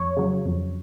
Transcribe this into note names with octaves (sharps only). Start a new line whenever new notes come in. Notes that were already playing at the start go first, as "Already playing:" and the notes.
Already playing: F2 C#5
C#3 F#3
F2